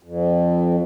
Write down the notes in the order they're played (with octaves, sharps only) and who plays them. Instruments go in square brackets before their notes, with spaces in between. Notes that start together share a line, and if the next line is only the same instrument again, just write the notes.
[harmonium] F2